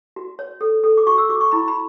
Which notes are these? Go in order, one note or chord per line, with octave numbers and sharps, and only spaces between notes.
F#4
C#5
A4
A4
D6
F#4 C#6
E6
F#4 D6
C#6
E4 B5
B5